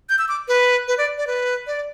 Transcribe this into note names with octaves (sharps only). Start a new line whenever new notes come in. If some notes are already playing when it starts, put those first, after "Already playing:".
G6
E6
D6
B4
B4
D5
D5
B4
D5